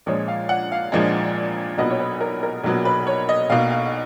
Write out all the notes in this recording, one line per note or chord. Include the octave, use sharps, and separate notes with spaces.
A#1 A#2 F3 G#3 C#5
F5
F#5
F5
A#1 A#2 F3 G#3
B1 A#2 F#3 B3 D#5
C#5
B4
A#4
A#4
B1 A#2 F#3 B3
B4
C#5
D#5
B1 B2 A#3 F5
F5